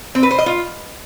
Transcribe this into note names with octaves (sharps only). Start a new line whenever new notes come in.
C4
B4
C5
D#5
F4